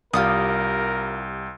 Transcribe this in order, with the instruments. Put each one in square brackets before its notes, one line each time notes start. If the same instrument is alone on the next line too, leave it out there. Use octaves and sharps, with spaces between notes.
[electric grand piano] C2 G4 [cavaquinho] F4 D5 D#6 [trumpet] A#4